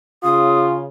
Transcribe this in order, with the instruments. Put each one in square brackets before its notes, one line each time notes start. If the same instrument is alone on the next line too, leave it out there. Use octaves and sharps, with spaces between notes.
[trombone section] C#3 [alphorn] F4 [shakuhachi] D#6